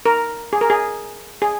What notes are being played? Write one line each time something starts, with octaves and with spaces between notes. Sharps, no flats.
A#4
G#4
A#4
G#4
G#4